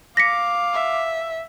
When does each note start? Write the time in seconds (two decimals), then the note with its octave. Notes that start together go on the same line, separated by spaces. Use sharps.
0.17 F5 D6 A#6 B6 C#7
0.74 E5